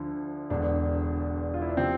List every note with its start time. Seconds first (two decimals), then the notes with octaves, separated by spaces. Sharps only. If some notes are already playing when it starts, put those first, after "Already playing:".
Already playing: D2 D3 F3
0.50 E1 E2 D3 D4
1.54 F4
1.62 E4
1.69 D4
1.77 C3 F3 C4